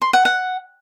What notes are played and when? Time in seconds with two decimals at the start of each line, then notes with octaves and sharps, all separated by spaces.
0.02 C6
0.13 F#5
0.25 F#5